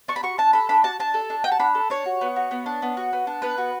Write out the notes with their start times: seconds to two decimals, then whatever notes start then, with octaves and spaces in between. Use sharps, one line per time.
0.08 D4 C#6
0.16 B5
0.23 F#4 C#6
0.38 D4 A5
0.53 A4 B5
0.69 D4 B5
0.84 F#4 A5
1.00 D4 A5
1.14 A4
1.30 D4
1.44 F#4 G5
1.52 A5
1.59 D4 B5
1.75 A4
1.90 D4 C#5
2.06 F#4
2.21 B3
2.36 F#4
2.51 B3
2.66 D4
2.82 B3
2.97 F#4
3.13 B3
3.27 D4
3.42 B3 B4
3.58 F#4